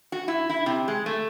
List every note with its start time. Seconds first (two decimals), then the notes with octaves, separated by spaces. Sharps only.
0.12 F#4
0.28 E4
0.49 E4
0.66 C3
0.88 G#3
1.06 A3